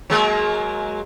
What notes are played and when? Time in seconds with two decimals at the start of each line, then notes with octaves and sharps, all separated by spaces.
0.10 F#3 G#3 A#3